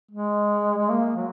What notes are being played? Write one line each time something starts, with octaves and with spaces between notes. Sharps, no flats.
G#3
G#3
A#3
F#3